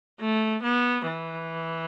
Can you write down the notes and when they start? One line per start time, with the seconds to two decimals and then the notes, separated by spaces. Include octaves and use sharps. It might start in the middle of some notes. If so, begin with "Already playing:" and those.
0.20 A3
0.63 B3
1.06 E3